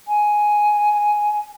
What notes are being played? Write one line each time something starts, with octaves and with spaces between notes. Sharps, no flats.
G#5